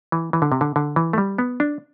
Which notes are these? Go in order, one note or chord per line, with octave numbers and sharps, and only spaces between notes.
E3
E3
D3
C3
D3
D3
E3
A3
G3
B3
D4